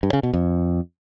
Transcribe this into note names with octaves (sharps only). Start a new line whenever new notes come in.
G2
C#3
B2
F2